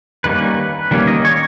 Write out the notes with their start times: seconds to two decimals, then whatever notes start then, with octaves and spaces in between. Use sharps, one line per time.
0.24 D#3 G3 A#3 C#4 B4
0.91 D#3 G3 A#3 C#4
1.07 D#5
1.25 C#5